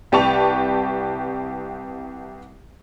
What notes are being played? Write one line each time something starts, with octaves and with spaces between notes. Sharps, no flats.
C2 G4 B4 A5 C#6 F7